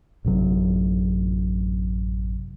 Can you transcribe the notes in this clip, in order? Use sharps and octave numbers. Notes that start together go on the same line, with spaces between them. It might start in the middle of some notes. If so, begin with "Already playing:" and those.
A1 F#2 C3 F#3